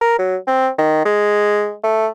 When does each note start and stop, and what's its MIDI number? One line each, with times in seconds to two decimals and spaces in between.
0.01 0.17 70
0.18 0.36 54
0.48 0.69 60
0.78 1.01 51
1.05 1.74 56
1.84 2.07 57